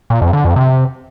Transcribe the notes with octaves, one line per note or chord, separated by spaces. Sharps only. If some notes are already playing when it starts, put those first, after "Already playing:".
A#2
F2
D3
F2
C3